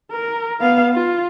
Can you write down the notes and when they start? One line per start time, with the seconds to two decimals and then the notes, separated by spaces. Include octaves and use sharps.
0.11 A#4
0.60 B3 F5
0.94 F4